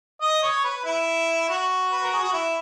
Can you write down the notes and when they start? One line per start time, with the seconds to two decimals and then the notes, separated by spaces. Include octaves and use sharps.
0.22 D#5
0.43 C#5
0.64 B4
0.85 E4
1.49 F#4
1.92 B4
2.03 A#4
2.13 G#4
2.23 F#4
2.33 E4